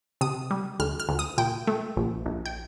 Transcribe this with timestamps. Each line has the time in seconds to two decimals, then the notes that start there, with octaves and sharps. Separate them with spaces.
0.21 C3 D#6
0.51 G3
0.80 D2 F6
1.00 F6
1.09 D2
1.19 D#6
1.38 A#2 G5
1.67 A3
1.97 A#1
2.26 A#1
2.46 G5